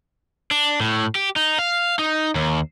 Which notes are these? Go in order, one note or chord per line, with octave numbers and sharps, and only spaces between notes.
D4
A2
G4
D#4
F5
D#4
D#2